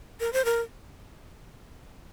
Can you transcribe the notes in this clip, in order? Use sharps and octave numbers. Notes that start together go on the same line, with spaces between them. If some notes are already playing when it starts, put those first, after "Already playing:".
A#4
C5
A#4